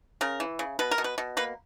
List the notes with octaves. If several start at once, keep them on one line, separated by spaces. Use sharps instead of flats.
C#3 A#4
E3
C#3
B2 B4
A#4
B2
B4
B2
A#3 B4